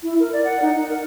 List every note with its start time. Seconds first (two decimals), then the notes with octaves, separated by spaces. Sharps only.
0.03 E4
0.20 A#4
0.33 D5
0.44 F#5
0.62 D#4
0.74 F#5
0.89 A#4